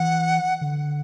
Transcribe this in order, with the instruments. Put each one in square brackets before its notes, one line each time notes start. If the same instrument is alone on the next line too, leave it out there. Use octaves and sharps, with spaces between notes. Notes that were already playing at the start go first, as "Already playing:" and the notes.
Already playing: [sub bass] E3 [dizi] F#5
[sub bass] D3